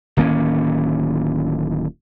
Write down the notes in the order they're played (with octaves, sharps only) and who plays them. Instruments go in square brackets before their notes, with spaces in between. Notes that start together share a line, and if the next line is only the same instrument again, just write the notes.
[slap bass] D1 D#3 A#3 C#4